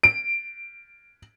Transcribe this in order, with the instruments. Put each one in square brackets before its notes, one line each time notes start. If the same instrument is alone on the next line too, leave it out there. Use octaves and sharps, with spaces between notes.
[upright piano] D7